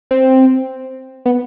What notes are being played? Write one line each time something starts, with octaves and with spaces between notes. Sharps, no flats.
C4
B3